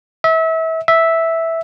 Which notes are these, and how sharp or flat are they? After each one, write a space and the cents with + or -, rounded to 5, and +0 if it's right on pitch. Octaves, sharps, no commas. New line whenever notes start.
E5 -30
E5 -5